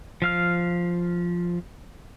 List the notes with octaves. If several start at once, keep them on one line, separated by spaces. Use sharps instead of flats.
F3 F5 F6